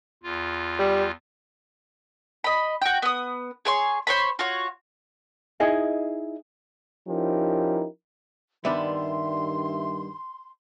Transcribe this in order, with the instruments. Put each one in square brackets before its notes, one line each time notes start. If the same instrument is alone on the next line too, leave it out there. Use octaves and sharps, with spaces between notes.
[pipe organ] E2 F4
[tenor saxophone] G3
[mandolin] D#5 B5
F#4 G5
B3 D#6
G#4 C#5 C6
C5 C#5 B5
F4 F#4 C#5
[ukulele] D#4 E4 G#4 D#5
[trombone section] F3 C#4 D#4 E4 G4 A#4
[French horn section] G2 D#3 [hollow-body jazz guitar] G3 B3 D4 [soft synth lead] E5 [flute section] C6